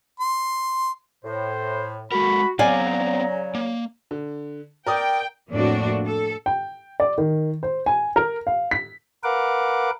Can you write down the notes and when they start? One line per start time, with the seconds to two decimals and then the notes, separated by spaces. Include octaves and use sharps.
0.20 C6
1.24 A2 C5
2.12 G#3 F#4 A4 A#4 B5
2.59 C#3 F#3 B3 C4 D5 F5 G#5 A#5
3.55 A#3
4.11 D3
4.87 A#4 D5 G5 D#6
5.51 F2 A2 A#3 C4 D4 F#4
6.06 A4
6.46 G5
7.00 D5
7.18 D#3
7.63 C5
7.86 G#5
8.16 A#4
8.47 F5
8.71 B6
9.24 A#4 B4 F5 F#5 D6